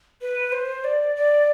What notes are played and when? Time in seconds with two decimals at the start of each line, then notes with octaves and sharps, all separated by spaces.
0.21 B4
0.52 C5
0.84 D5
1.16 D5